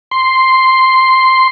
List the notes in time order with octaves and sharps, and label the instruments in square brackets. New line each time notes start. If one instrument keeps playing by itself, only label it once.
[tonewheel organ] C6